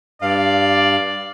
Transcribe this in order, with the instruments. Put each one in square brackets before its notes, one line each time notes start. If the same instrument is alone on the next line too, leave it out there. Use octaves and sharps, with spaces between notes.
[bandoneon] G2 F5 [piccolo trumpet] D5